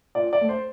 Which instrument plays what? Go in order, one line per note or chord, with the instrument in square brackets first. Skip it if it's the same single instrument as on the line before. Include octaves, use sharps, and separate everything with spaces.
[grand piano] A#2 D5
D5
A3
C5